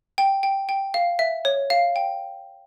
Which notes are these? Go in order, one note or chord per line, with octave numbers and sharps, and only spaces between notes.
G5
G5
G5
F5
E5
C#5
F5
G5